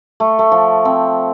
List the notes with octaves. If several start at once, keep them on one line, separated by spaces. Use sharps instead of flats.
A3
A3
F3
C4